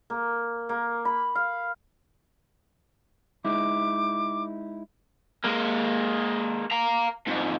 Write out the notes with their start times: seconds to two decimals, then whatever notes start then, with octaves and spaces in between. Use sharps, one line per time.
0.10 A#3
0.69 A#3
1.05 B5
1.35 F5
3.45 G#3 D#4 E4 D6
5.44 G#3 A#3
6.71 F5 A#5
7.27 F2 G#2